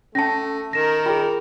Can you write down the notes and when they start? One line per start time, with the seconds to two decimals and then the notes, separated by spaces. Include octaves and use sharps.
0.15 A3 C#4 A5 A#6
0.73 D#3 A#4 A#6 E7
1.06 F4 G#4 G5